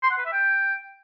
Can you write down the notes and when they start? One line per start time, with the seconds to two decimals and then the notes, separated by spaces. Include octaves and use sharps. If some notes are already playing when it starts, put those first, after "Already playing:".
0.03 C6
0.10 F#5
0.18 B4
0.25 E5
0.33 G5